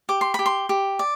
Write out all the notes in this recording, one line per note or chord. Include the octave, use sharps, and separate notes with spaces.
G4 D6
C6
G4 B5
C6
G4
D5